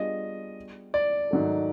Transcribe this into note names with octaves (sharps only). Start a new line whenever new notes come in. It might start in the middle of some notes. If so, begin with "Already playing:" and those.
Already playing: G3 B3 D4 F4 G#4 D#5
D5
G#2 D#3 F#3 A3